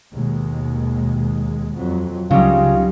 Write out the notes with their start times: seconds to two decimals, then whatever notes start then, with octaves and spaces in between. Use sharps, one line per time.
0.13 D#2 B2 G#3
1.77 F2 F#3
2.31 C#2 C#3 F#3 G3 D#4 F4